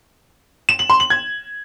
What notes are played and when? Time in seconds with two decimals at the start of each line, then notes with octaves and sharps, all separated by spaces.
0.69 E7
0.79 F#7
0.90 C6
1.00 F#7
1.10 G#6